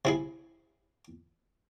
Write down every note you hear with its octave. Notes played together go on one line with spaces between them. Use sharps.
C3 E4 G#4